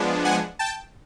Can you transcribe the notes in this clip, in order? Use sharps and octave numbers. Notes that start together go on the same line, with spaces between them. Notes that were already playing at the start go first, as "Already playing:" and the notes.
Already playing: F3 G#3 B3 D4
F#5 G#5
G5 A5